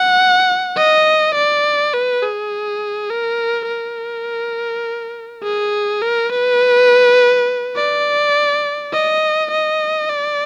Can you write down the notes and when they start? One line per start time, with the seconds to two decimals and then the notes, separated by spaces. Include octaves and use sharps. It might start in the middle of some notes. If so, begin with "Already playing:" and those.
Already playing: F#5
0.77 D#5
1.35 D5
1.94 B4
2.23 G#4
3.10 A#4
3.68 A#4
5.43 G#4
6.02 A#4
6.30 B4
7.76 D5
8.93 D#5
9.52 D#5
10.10 D5